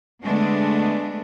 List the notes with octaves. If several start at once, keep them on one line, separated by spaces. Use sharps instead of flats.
D3 G#3 A3 B3 D4